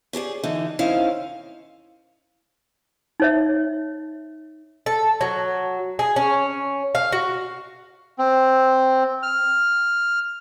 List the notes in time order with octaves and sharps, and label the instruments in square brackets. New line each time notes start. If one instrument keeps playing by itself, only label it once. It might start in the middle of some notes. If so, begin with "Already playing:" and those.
[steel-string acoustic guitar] C#4 G4 G#4 D5
D3 E3 D#4
D#2 C4 C#4 D#4 E4 F5
[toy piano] D#4 C#5 E5
[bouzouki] A4
F#3
G#4
C#4
F5
F#4
[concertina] C4
F6